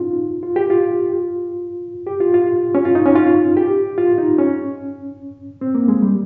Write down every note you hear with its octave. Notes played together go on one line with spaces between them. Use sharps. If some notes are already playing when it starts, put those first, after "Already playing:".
Already playing: C#4 D#4 F4
F4
G4
F4
G4
F4
F4
C#4
F4
D#4
C#4
F4
G4
F4
D#4
C#4
C4
A#3
G#3
G3